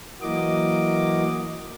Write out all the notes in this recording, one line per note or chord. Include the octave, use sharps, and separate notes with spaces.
E3 F#3 A#3 F#4 D#5 D6